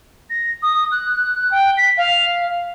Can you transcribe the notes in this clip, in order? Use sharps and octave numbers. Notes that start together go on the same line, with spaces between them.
A#6
D#6
F#6
G5
B6
F5